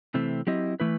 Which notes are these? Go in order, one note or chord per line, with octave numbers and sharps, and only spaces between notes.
C3 E3 A3 C4
F#3 C4 E4 G4 D#5
E3 A3 E4 B4